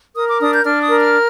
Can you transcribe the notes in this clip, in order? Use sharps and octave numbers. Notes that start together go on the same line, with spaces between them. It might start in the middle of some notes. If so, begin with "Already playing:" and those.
A#4 D#6
D6
D4 D#6
G6
D4 F6
D#6
A#4
F6